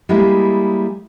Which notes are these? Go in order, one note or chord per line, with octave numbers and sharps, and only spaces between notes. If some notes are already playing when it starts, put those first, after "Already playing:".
G3 G#3 A#3 E4 G#4